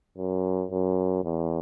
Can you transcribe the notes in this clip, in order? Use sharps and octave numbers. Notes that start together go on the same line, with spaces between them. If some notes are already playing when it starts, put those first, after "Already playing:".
F#2
F#2
E2